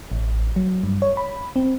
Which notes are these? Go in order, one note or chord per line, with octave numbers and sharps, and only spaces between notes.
A1
F#3
G2
C#5
B5
C4